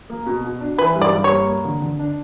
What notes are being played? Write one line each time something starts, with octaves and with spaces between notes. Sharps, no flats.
A#3
B2
B2
D4
E3 B4
G2
D5
G2
C#5
A#3
A#3
D3
D3
D4